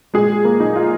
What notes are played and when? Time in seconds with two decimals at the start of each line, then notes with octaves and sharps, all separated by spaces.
0.14 A#2 G#3 G#4
0.29 G#3
0.44 A#2 A#3 A#4
0.60 A#2 D#4
0.75 F3 F4